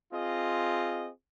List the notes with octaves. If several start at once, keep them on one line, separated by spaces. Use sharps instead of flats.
C4 F4 G#4 D#5